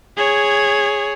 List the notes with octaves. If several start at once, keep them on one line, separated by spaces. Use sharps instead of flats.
G#4 C#5